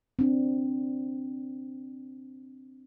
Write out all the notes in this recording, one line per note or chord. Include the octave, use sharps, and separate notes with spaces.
C4 D4